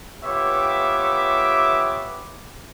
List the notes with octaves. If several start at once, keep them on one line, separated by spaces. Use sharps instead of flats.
B3 F4 G4 C#5 E5 D6